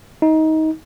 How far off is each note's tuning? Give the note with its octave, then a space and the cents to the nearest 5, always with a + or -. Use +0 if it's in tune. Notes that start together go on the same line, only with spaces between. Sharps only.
D#4 +20